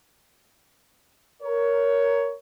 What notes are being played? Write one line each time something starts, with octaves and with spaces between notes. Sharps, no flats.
A#4 C#5